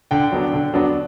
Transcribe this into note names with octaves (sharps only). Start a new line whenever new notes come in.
D3 G5
F#3 B3 D4
D3
F#3 B3 D4